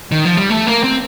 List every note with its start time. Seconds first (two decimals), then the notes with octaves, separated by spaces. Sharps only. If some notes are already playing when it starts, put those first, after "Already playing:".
0.12 D#3
0.25 F3
0.37 G3
0.50 A3
0.67 A#3
0.83 C4